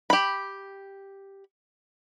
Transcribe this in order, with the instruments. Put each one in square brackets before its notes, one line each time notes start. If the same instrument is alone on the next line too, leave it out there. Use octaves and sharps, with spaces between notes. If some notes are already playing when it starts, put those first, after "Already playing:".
[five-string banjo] G4 B5